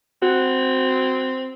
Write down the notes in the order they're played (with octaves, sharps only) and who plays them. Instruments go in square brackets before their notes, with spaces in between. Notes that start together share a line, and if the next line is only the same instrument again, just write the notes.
[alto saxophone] C4 [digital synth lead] F#4